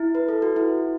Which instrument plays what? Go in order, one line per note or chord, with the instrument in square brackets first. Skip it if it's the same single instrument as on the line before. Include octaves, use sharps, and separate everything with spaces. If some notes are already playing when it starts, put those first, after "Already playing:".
Already playing: [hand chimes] E4
B4
A4
F#4
E4